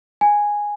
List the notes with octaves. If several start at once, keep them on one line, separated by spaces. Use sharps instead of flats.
G#5